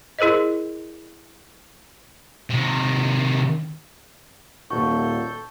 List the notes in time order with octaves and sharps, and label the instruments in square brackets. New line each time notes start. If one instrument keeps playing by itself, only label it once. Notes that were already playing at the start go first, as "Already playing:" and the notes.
[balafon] E4 G#4 A#4 C5 D#5
[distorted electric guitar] C3 D#3
[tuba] D#1 [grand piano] A#2 F#4 [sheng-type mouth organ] A4 G6 [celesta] C#6